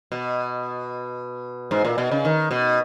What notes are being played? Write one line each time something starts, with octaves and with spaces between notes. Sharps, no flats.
B2
G#2
A#2
B2
C#3
D#3
B2